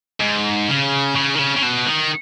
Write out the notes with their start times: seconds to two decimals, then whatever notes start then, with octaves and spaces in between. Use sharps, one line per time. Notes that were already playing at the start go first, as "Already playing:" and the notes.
0.20 G#2
0.69 C#3
1.16 C#3
1.35 D#3
1.39 C#3
1.56 C#3
1.62 B2
1.86 D#3